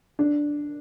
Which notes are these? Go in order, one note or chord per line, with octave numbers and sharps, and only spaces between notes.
D4